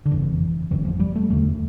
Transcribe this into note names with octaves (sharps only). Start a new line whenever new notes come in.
D3
G1 F2 C#3 E3
G1 F2 D3 E3
F3
G3
A3
E1 E2 D3 A3